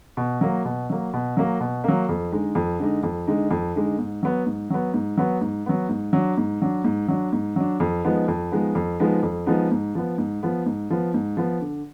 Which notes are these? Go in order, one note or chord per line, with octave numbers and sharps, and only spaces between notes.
B2
F#3 A#3
B2
F#3 A#3
B2
F#3 A#3
B2
F#3 A#3
F2
D3 G#3 D#4
F2
D3 G#3 D#4
F2
D3 G#3 D#4
F2
D3 G#3 D#4
G#2
F#3 B3
G#2
F#3 B3
G#2
F#3 B3
G#2
F#3 B3
G#2
F#3 D4
G#2
F#3 D4
G#2
F#3 D4
G#2
F#3 D4
F2
F3 G#3 B3 D#4
F2
F3 G#3 B3 D#4
F2
F3 G#3 B3 D#4
F2
F3 G#3 B3 D#4
G#2
F3 B3
G#2
F3 B3
G#2
F3 B3
G#2
F3 B3
D3